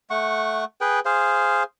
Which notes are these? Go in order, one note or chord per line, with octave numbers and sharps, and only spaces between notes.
A3 F#5 C#6
G#4 B4 G5
G#4 C5 F5